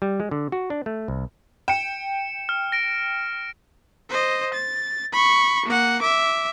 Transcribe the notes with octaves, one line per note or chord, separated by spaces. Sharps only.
G3
G#3
D3
F#4
D4
A3
C2
G5 C#7 E7
F6
A#6 D7
C5 D#5
A6
B5 C#6
A#3 F#5
E5 D6